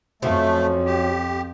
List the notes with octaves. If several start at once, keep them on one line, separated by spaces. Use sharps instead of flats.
F2 F3 F#3 A3 C#4
G4